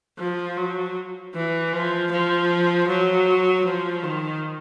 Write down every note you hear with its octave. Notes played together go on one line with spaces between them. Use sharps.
F3
F#3
E3
F3
F3
F#3
F3
D#3